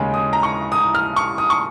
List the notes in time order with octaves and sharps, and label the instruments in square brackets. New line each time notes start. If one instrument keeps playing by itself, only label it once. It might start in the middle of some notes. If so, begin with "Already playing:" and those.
Already playing: [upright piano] D#2 C#3 G#3 C#4
D#6
A#5
C#6
D#6
F6
C#6
D#6
C#6